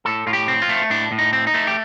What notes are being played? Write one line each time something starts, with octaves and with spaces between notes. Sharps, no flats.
A2 A4
A2 F4
G4
C4
F4
A3
A2 D4
A2
D#4
C4
D#4
A3
G4